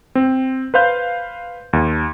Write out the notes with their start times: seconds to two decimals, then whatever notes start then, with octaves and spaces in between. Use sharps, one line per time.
0.15 C4
0.74 B4 C5 F5 G6
1.73 D#2